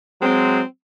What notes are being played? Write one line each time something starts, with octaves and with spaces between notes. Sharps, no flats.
F#3 G#3 C4